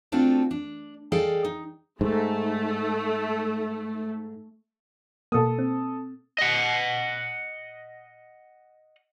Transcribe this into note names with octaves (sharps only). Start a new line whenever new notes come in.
A3 C4 D4 F4 F#4 A4
D4
G#4 A4 D5 D#5 F5 G5
D#4
G#2 A3
B2 A#3 A4 D#6
C4
D#5 F#5